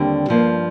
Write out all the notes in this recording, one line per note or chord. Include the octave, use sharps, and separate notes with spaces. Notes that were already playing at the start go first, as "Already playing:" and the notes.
Already playing: D#2 D3 G3 C4
G2 F3 A#3